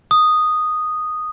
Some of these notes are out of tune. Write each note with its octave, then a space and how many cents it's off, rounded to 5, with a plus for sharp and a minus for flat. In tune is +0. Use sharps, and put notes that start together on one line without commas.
D#6 -5